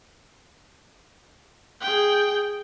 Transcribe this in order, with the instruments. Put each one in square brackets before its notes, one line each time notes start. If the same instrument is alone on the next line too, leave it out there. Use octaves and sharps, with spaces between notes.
[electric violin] G#4 G5